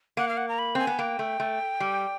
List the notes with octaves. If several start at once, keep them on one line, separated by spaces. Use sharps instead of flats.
A#3 F#5
F5
F#5
A#5
B5
C4 G#5
B3
A#3 G5
A3
A3
G3